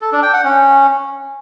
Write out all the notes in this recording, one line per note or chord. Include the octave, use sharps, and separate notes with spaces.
A4
D4
G5
F#5
C#4